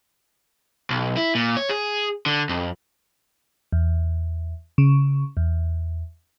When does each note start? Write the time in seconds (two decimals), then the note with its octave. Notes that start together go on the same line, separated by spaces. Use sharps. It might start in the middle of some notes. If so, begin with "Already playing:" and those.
0.90 B1
1.17 E4
1.35 A#2
1.57 C#5
1.69 G#4
2.26 D3
2.49 F2
3.72 E2
4.78 C#3
5.37 E2